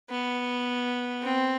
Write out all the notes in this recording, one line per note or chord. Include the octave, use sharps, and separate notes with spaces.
B3
C4